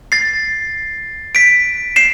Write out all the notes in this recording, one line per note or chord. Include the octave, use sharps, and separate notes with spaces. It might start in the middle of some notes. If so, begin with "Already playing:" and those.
A6 C7
B6 D7
C7 E7